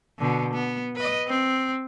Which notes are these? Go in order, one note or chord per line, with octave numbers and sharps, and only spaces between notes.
B2 D3
B3
B4 D#5
C4